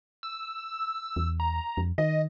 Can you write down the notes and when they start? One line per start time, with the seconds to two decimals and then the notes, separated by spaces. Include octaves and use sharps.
0.23 E6
1.16 E2
1.40 A#5
1.77 F2
1.98 D#3 D#5